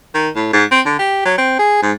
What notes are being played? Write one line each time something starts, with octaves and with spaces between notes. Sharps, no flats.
D#3
A2
G#2
C4
D3
G4
F#3
C4
G#4
G#2